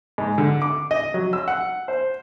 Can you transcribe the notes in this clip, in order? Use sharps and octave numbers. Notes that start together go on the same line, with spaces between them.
G#2
D3
D6
D#5
F#3
E6
F#5
C5